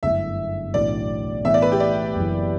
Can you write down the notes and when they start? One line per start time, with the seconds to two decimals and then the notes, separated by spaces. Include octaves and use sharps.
0.03 G1 F#2 D3 A3 E4 E5
0.73 B1 A2 E3 B3 D4 D5
1.45 A2 E3 B3 E5
1.54 D5
1.62 B4
1.72 G4
1.80 D5
2.15 F#1 F#2 E3